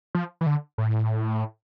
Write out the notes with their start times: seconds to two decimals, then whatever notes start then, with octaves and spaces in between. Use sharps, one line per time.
0.15 F3
0.41 E3
0.46 D3
0.78 A2